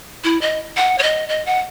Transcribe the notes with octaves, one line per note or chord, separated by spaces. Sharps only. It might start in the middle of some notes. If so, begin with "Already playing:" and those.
E4
D#5
F#5
C#5
D#5
D#5
F#5